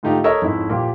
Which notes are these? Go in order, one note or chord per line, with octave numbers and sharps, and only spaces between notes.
G#2 D3 A3 D#4 F4 G4
A4 A#4 C#5 D#5 E5 E6
F2 G#2 C#4 E4
A#2 F3 G4